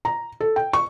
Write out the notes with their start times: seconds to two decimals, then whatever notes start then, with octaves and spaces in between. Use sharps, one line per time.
0.05 A#5
0.40 A4
0.56 G5
0.73 C#6